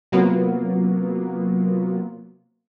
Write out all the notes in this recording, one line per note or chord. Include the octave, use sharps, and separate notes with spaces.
C3 F#3 A#3 B3 F4